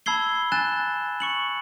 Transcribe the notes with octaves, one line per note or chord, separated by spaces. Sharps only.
A5 B5 E6 G#6 C7 G7
G#5 F#6 A6 E7
C#6 C#7 F#7